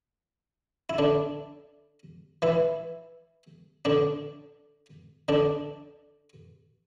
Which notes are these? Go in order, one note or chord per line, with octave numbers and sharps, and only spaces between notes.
E4
D3 D4
E3 E4
D3 D4
D3 D4